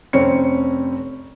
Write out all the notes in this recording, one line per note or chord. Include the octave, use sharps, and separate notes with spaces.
F1 C4 C#4 C#7